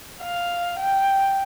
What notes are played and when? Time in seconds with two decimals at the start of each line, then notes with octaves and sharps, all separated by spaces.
0.22 F5
0.79 G5